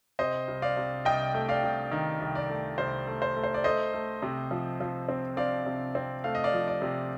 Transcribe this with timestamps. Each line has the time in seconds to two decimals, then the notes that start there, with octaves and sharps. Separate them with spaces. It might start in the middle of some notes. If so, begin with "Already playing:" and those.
0.19 C3 C5 D#5
0.48 C2
0.62 D5 F5
0.77 C3
1.05 C2 D#5 G5
1.34 A3
1.49 D5 F5
1.63 C2
1.92 D#3
2.20 C2
2.35 D5
2.49 A3
2.78 C2 C5
3.07 A3
3.22 C5
3.36 A3
3.44 C5
3.54 D5
3.64 A3 C5 D#5
3.94 A3
4.22 C3
4.51 F3
4.80 F3
5.08 C4
5.37 C4 D5 F5
5.66 C3
5.95 C4
6.24 A3 F5
6.35 D#5
6.44 D5 F5
6.53 F3
6.68 D5
6.82 C3